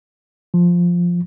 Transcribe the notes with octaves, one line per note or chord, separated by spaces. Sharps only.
F3